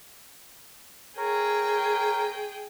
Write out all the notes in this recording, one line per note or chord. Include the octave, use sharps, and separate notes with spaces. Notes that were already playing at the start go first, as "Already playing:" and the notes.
G#4 A#4 C#5 G5